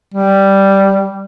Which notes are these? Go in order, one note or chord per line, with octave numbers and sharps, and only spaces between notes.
G3